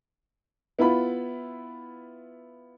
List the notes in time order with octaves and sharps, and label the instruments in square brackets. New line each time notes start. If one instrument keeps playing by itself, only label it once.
[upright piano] B3 E4 F4 B5